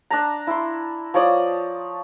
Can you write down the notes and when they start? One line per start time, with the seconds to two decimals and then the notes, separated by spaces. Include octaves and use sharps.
0.10 D4 A5 A#5
0.47 E4 C6
1.14 F3 C#5 D5 D#6